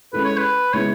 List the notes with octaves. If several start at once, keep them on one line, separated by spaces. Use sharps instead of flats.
G#3 C#4 E4 A4 B4
C#5
B4
C#3 G#3 B3 E4 C#5